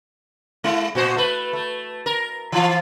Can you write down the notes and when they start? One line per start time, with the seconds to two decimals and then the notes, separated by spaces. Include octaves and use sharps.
0.64 G#3 E4
0.95 A#2 F#4 C5
1.16 A3 B4
1.53 A3
2.06 A#4
2.52 E3 F3 F4